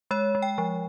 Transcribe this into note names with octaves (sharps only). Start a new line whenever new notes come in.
G#3 C#5
G#3
G5
F3